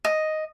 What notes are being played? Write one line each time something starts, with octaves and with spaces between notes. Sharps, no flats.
D#5